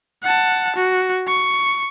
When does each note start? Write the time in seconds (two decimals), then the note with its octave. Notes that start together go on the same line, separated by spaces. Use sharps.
0.23 F#5 A5
0.76 F#4
1.28 C#6